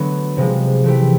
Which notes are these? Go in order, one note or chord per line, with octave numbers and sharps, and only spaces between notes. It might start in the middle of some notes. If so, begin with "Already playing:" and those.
Already playing: D3 F#3 A3 B3
C3 F3 G#3
E3 A3 C4 E4 G4